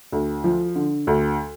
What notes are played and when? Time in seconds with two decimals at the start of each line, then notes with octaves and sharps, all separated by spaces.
0.12 D2
0.44 F3
0.76 D3
1.07 D2